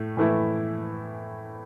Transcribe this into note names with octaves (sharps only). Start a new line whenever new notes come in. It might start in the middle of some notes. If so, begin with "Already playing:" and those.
Already playing: A2 A3
A2 E3 A3 E4